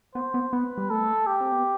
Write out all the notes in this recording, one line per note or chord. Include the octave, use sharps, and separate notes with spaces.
B3 C5
B3
B3 B4
G3
A3 A4
G4
C4
B3